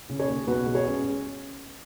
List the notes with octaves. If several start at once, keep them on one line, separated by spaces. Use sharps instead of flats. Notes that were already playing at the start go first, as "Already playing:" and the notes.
C#3
G#4 C#5
D#2
B1 F#4 B4
G#3
G#4 C#5
C#4